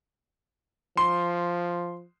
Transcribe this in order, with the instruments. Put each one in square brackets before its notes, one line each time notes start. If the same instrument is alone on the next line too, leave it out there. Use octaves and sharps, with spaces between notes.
[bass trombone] F3 [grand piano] C6